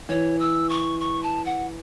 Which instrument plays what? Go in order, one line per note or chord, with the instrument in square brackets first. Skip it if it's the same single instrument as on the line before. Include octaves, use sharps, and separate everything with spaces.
[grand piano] E3 [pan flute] C#5
[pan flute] E6
C#6
C#6
A5
F#5